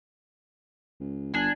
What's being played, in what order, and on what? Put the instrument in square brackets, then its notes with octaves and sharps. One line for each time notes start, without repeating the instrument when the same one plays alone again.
[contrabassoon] C#2
[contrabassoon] G1 [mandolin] D4 G#5